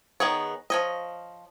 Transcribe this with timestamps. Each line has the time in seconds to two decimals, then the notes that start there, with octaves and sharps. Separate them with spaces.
0.20 D#3 B3 G#4 C#5
0.70 F3 C#5 D#5